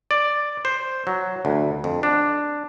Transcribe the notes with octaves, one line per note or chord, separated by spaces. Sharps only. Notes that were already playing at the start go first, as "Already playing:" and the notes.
D5
C5
F#3
D2
F2
D4